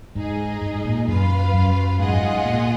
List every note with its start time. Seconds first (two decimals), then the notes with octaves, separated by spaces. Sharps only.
0.15 G#2 D#4 G#4 D#5
0.62 G#2
0.85 A#2
1.07 F#2 F4 B4 F5
1.54 F#2
1.99 G#2 F4 G#4 D#5 F#5
2.08 F#2
2.16 G#2
2.45 A#2